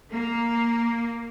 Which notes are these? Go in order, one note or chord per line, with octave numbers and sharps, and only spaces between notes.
A#3